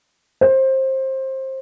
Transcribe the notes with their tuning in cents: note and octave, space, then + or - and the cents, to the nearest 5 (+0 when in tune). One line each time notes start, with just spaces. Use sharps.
C5 +20